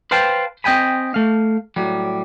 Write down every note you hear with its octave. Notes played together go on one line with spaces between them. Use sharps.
B4 C5 F5 G5 A5
C4 D#5 G5 G#5 B5
A3 F5
A2 F#3 G3